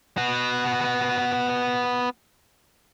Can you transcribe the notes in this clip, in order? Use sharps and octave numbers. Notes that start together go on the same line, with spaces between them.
B3 F#4